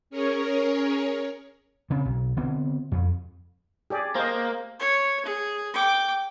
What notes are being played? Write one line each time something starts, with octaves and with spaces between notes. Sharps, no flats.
C#4 G#4 A#4 C#5
C#3 C4
B1
D3 B3 C4
F2
G4 G#4 D5
A#3 C5 D#5
C#5
G#4
G5 D6